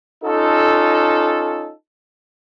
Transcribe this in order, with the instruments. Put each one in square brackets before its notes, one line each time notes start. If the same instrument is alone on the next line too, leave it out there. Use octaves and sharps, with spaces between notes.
[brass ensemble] C#4 D#4 F4 A4